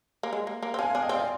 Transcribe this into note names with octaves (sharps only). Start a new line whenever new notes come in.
A#3
G#3
A#3
A#3
C4
D4 F5 G#5
D4 F5 G#5
D#5 G5
C4 D5 F5
F5